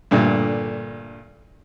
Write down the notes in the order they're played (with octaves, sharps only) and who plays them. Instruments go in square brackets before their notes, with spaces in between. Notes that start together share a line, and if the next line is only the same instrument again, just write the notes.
[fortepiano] G2 A#2 D3 A3